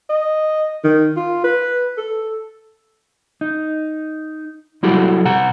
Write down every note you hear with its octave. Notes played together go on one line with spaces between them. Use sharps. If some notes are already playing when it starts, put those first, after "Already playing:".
D#5
D#3
F4
B4
A4
D#4
F#3 G3 E4 F#4 G4 A4
C3 F#5 A#5